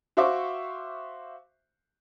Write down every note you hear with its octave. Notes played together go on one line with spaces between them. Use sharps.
F#4 C5 E5 F5 C#6 D6